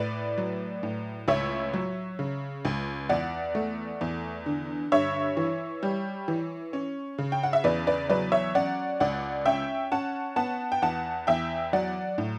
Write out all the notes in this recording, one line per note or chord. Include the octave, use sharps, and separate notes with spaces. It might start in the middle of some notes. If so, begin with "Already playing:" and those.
Already playing: A2 B4 D5
F#3
A2
C#2 C#5 E5
F#3
C#3
C#2
E2 D5 F#5
A3
E2
D3
G2 C#5 E5
E3
G3
E3
C#4
C#3
G5
F#5
E5
E2 B4 D5
B4 D5
F#3 B4 D5
C#5 E5
C#4 D5 F#5
C#2 D5 F#5
C#4 E5 G5
C#4 F#5 A5
B3 F#5 A5
G5
E2 F#5 A5
E2 E5 G5
F#3 D5 F#5
A2